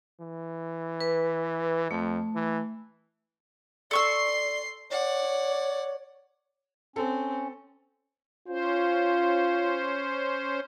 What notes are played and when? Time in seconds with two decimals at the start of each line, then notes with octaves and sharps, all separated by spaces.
0.21 E3
1.00 B4
1.91 F2 A3
2.35 E3
3.91 A4 D5 C6 C#6 E6 C7
4.90 C#5 D5 F#5
6.96 C4 C#4 A4
8.48 C#4 F4 C5